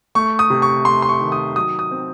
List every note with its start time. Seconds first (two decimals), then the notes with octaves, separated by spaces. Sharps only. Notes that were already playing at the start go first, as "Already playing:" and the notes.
0.15 A3 C#6
0.39 D#6
0.50 C3
0.62 C#6
0.85 A3 C6
1.02 C6
1.09 C#6
1.20 D#3
1.32 D#6
1.56 F#3 D#6
1.79 D#6
1.91 C4